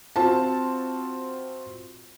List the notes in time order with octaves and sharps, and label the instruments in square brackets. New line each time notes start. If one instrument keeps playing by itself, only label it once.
[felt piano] C4 F4 F#4 A5